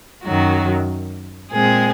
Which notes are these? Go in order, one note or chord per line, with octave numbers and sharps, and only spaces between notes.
F#2 D#3 F#3 F#4
A#2 G#3 C4 G#4